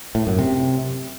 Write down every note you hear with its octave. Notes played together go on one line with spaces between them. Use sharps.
A2
F#2
C3